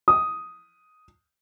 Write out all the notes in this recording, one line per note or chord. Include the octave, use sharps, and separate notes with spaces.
D#6